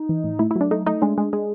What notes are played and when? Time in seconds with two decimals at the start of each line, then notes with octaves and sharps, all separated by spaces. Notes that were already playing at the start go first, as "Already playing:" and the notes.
Already playing: D#4
0.09 E3
0.24 A2
0.39 A3 E4
0.51 F#3 E4
0.61 D4
0.71 A3 D#4
0.86 A3 D#4
1.02 G#3 D4
1.18 G#3
1.33 G#3